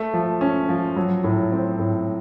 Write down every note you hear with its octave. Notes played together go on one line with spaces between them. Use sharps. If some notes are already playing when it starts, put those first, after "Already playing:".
Already playing: A3
F3
C#4
F3
F#3
A2
C4
A2